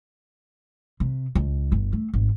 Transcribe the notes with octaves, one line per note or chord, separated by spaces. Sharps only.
C3
C#2
G1
A3
G#1